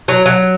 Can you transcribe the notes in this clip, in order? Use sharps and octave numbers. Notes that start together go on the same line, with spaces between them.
F#3
F#3